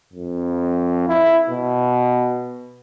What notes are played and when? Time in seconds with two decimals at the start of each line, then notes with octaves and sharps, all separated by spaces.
0.13 F2
1.08 E4
1.50 B2